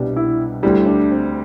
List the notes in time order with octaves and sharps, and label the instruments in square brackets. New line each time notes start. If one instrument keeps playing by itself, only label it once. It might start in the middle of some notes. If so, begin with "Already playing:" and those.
Already playing: [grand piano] C2 B2 G3 D4
[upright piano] E4
[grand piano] D2 D3 G3 [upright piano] E4
[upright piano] D4
C4